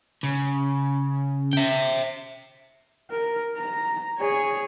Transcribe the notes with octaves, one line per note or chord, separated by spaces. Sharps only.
C#3
E5 G5
A#4
A#5
G#4 C#5